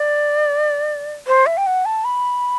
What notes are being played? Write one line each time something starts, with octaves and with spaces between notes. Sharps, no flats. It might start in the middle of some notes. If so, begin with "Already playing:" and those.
Already playing: D5
C5
E5
G5
F#5
A5
B5